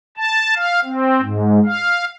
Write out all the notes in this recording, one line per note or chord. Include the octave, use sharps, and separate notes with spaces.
A5
F5
C4
G#2
F5